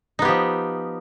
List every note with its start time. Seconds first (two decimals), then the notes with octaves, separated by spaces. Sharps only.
0.19 D#4
0.22 B3
0.25 G4
0.28 F3